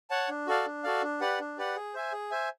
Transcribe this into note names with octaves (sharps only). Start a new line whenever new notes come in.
C#5 F#5 A5
D4
F#4 A4 D5 F5
D4
F#4 A4 D5 F5
D4
G4 B4 D5 F#5
D4
G4 B4 D5 F#5
G#4
C5 E5 G#5
G#4
C5 E5 G#5